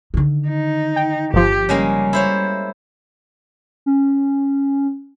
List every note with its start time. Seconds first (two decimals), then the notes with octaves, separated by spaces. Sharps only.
0.14 D3 D#3
0.48 D#4
0.96 G5
1.34 G1 F3 G4
1.69 C#3 G3 G#3 A#3
2.13 E4 C5 C#5
3.86 C#4